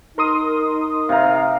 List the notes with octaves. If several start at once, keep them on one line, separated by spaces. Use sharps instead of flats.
D#4 A#4 C6 D#6
C3 F5 A#5